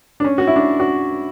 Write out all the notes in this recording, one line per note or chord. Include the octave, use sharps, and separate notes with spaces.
D4
C#4
F#4
E4
D4
F#4